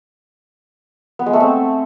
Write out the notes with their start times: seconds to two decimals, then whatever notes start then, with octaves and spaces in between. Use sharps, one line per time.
1.19 B3
1.26 G#3
1.33 A3
1.40 C4